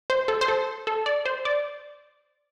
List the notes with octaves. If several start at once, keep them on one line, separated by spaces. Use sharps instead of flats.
C5
A4
C5
A4
A4
D5
C5
D5